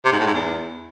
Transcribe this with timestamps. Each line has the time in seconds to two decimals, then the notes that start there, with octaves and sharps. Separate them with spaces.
0.05 C3
0.12 G#2
0.19 A2
0.26 G#2
0.34 E2